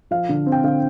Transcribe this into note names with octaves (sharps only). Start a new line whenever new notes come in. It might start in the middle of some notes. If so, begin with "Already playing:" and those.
F3 F5
D3
C4
G5
D3 F5